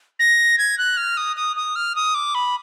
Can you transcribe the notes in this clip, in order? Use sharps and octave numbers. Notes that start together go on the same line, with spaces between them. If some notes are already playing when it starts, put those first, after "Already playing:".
A#6
G#6
F#6
F6
D#6
D#6
D#6
F6
D#6
D6
B5